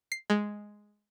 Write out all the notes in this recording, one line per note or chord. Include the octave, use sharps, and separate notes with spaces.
C7
G#3